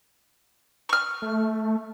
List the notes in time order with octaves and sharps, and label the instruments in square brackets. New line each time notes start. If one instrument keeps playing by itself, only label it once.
[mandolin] C#6 F6
[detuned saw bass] A3